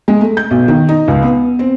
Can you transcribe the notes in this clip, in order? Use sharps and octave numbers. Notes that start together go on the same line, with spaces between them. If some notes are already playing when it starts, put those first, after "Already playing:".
G#3
A3
G6
B1
D#3
D#4
C#2
B3
C4